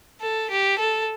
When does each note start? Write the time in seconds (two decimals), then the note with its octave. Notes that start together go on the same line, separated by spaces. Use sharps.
0.21 A4
0.51 G4
0.79 A4